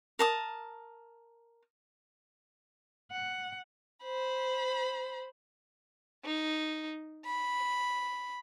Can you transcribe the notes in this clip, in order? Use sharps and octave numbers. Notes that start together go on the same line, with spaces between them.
A#4 A5 D#6
F#5
C5 B5
D#4
B5